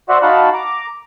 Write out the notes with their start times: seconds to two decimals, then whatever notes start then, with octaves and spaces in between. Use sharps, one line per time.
0.09 F#4 C5 D5 E5 F#5
0.22 D#4 F#4 F5 F#5 A5 B5
0.54 A#5 D6